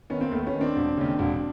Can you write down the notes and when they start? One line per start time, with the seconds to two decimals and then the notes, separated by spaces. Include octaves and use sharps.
0.10 D#3 B3 C#4
0.21 A#3 C4
0.32 D#2 A3 B3
0.47 B3 C#4
0.54 D#3
0.61 C4 D4
0.76 E1
0.97 D#2 C#3
1.19 E1